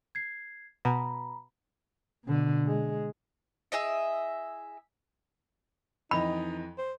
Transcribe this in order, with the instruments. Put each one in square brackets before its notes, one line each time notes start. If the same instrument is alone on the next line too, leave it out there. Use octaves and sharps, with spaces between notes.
[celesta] G#6 C7
[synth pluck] B2 [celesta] A#5 B5
[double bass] B2 D3
G#3
[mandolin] E4 G#4 D#5 E5
[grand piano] F2 E3 D#5 [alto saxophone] D#4 [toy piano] B5
[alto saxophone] C5